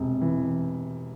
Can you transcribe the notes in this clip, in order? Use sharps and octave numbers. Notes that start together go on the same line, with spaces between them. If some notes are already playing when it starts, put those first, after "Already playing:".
Already playing: E1 C3
E3